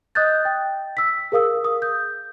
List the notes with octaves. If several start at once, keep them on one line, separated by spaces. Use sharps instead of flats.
D#5 D#6 F#6 G6 A6
G5
E6 B6
G#4 A#4 F5 D#6 E6
D#6
G6